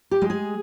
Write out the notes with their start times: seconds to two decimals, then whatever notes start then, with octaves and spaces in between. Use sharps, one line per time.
0.11 G4
0.22 G#3
0.30 G#4